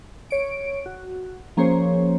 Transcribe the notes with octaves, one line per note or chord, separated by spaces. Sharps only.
C#5 D7
F#4
F3 A#3 C#4 G#4 C5 C#5